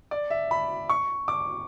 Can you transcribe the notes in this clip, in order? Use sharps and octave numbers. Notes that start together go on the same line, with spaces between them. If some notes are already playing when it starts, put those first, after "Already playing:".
D5
E5
B5
C#6
D6